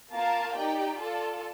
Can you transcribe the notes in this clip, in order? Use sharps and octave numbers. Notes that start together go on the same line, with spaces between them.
A#3 F4 A#4 F5 A5
D#4 G4 D5 G5
F4 A4 D5 A5